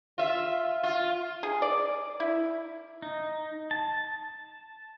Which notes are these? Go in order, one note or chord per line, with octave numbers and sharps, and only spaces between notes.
F4 E5
F4
G#4
D5
E4
D#4
A5